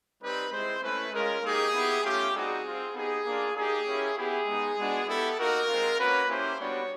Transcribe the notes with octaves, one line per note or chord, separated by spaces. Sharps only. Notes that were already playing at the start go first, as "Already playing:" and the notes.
G3 C4 D#4 G4 B4
G#3 C4 E4 C5
A3 C#4 E4 B4
G#3 C#4 F4 A#4
A#3 D#4 G4 G#4
B3 E4 G4
A3 C#4 F4 G4
G3 C4 D#4 F#4 G#4
C4 F4
B3 D#4 G4 G#4
A#3 D4 F4
A#3 D#4 G4 G#4
A#3 C#4 E4 G4
B3 E4 G4 G#4
G#3 B3 D#4
G#3 B3 D4 F#4
B3 E4 G4 A4
A#3 D#4 F#4 A#4
G#3 C4 F4
A#3 C#4 F#4 B4
A#3 C#4 E4 G4 C5
G3 B3 D4 F#4 C#5